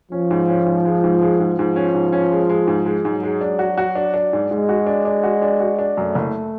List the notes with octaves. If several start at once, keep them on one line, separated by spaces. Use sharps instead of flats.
F3 C#4
G#2
C#4
G#2
G#3
G#2
G#3
G#2
G#2 F3
C#4
G#2
C#4
G#3
G#3
G#2
G#3
G#2 F#3
G#3
D4
F#4
F#4
D4
D4
G#2
G#2 G#3
F#4
D4
D4
F#4
D4
F#4
D4
F#2 A3
F#1